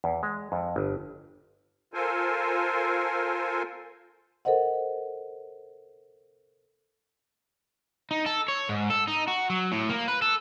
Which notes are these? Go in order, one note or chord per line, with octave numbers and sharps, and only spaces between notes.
E2
G#3
F2
G1
F4 A4 A#4 C5 G#5
A4 A#4 C5 D#5 F#5
D#4
A4
C#5
G#2
A4
D#4
F#4
F#3
A2
A#3
B4
A4